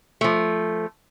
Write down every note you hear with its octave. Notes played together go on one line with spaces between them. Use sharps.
F3 A3